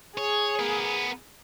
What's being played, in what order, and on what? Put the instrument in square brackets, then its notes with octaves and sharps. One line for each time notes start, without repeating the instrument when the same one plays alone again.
[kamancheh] G#4 [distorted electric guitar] C#5
[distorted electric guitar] B3 A#4